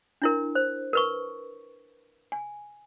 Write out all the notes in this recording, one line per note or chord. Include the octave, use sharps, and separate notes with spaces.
D4 E4 A#4
C5
A#4 B4 C#6
G#5